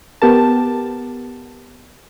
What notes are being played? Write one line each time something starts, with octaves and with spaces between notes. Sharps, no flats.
B3 G4 A#4 A5